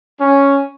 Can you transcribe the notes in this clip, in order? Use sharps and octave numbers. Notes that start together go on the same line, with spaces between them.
C#4